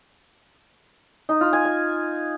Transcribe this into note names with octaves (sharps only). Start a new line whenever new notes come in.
D#4
F4
G#5
G#5